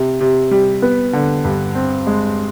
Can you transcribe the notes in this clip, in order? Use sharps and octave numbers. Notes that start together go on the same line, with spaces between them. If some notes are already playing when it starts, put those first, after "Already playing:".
Already playing: C3
C3
G3
B3
D3
G2
C4
G#3